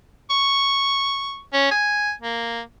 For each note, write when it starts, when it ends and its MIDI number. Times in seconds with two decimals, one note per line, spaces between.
0.30 1.40 85
1.53 1.68 61
1.71 2.13 80
2.22 2.61 58